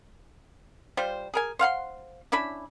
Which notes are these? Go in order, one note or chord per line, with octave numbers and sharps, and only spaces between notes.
G3 F4 C5
G#4 A#4 G#5
C5 F5 F#5 C6
C#4 D4 E4 B5